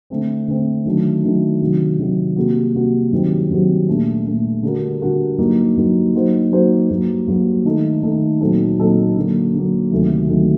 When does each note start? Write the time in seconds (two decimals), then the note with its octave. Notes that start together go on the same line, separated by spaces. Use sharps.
0.10 D3 A3 C4
0.48 D3 A3 C4
0.85 D#3 F#3 A3 D4
1.23 D#3 F#3 A3 D4
1.61 C3 D#3 F#3
1.98 C3 D#3 F#3
2.36 C3 G3 A#3 F#4
2.75 C3 G3 A#3 F#4
3.12 G2 D#3 F#3 C4 G4
3.50 G2 D#3 F#3 C4 G4
3.88 A#2 A3 D4
4.25 A#2 A3 D4
4.63 D3 G3 D4 F#4 A#4
5.01 D3 G3 D4 F#4 A#4
5.38 G2 F#3 A#3 D#4
5.76 G2 F#3 A#3 D#4
6.15 F#3 A#3 D#4 F#4 C5
6.52 F#3 A#3 D#4 F#4 C5
6.90 G2 F#3 A#3
7.27 G2 F#3 A#3
7.65 D#3 A3 D#4 A4
8.03 D#3 A3 D#4 A4
8.41 A#2 F#3 C4 D#4 A4
8.78 A#2 F#3 C4 D#4 A4
9.16 D3 F#3 A#3
9.54 D3 F#3 A#3
9.91 D2 C3 D#3 F#3 A3
10.29 D2 C3 D#3 F#3 A3